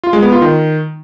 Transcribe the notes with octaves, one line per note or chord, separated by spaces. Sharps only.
F4
G#3
B3
F4
D#3